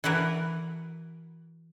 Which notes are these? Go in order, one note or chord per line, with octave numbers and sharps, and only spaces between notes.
E3 E4 F#4 A#4 B4